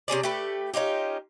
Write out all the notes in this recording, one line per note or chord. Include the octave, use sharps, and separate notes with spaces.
C3 C#4 G#4 D5
A3 G4 B4
C#4 D#4 F4 G4